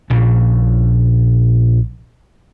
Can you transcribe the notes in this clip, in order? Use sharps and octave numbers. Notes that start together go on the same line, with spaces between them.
A#1 A#2 C#3